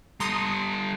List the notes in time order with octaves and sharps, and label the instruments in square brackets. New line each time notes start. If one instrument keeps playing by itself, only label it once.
[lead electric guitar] G3 A4 [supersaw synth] A#5 C6 D#6